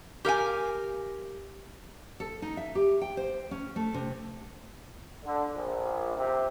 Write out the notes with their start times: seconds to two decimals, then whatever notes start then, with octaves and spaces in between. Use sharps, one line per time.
0.25 G4 A#4 F5 G#5
2.20 A4
2.42 D#4
2.57 E5
2.75 G4
3.01 G5
3.17 C5
3.51 C#4
3.76 A3
3.94 C3
5.23 D3
5.55 A#1
6.16 C3